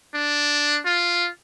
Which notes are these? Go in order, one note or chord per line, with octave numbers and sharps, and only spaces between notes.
D4
F4